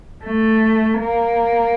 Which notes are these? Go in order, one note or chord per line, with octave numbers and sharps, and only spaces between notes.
A3
A#3